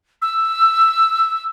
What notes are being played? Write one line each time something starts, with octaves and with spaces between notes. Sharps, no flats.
E6